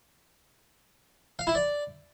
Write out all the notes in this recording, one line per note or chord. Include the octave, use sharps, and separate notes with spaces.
F5
E4
D5